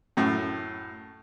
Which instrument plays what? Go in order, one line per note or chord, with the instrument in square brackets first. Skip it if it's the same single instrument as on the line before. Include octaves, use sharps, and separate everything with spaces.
[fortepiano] F#2 A2